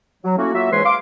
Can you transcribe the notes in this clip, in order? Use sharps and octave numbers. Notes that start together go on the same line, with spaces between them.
F#3
A3 A#3 C#4 E4 F#4
F#3 A#3 F4 F#4 E5
G#2 E3 G#3 B4 C#5 C6
F5 C6 D6